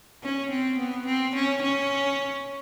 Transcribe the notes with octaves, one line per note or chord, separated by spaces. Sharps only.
C#4
C4
B3
C4
C#4
C#4